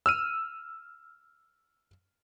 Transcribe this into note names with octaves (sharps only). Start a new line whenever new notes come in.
E6 F6 D#7